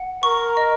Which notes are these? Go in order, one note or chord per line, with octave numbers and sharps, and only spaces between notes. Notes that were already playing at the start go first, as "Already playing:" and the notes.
Already playing: F#5
A#4 C#6
D#5